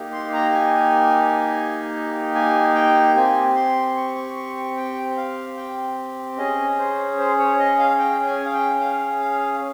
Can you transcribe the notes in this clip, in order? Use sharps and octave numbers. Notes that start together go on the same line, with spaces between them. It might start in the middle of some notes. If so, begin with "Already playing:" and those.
Already playing: A#3 D#4 G4
C6
A#5
G#5
G#5
G5
C4 G4 G#5
C6
C#6
C#6
C#6
C#6
G5
F5
G5
C#4 G#4 D#5
C5
C5
C#5
D#5
F5
G5
G#5
F5
G5
F5
F5